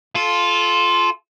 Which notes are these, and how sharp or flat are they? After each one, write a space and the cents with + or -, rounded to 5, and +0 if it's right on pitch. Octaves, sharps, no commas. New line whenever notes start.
F4 +0 A4 -25